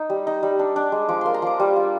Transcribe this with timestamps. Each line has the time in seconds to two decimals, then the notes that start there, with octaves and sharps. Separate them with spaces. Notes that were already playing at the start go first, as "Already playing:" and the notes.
Already playing: D#4
0.10 G3
0.27 D#4
0.43 G3
0.59 D4
0.76 D4
0.92 G#3
1.09 F3 D6
1.21 A#3 C6
1.34 A#5
1.42 F3 D6
1.60 G3
1.76 F4